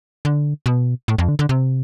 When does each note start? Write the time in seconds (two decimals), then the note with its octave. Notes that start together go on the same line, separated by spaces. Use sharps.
0.25 D3
0.66 B2
1.08 A2
1.18 F2
1.29 D3
1.39 D3
1.49 C3